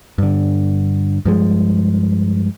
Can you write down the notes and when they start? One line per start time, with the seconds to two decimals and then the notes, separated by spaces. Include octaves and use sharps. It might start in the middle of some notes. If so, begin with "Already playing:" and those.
0.18 G2 D3
1.25 G2 F3 G#3